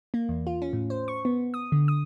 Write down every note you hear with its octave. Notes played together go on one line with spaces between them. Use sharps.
A#3
E2
F4
C#4
A2
C5
C#6
B3
D#6
D3
D#6